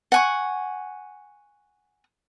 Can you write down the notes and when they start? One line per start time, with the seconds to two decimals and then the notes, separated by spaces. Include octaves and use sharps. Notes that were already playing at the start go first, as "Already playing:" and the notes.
0.12 F#5 G#5 C#6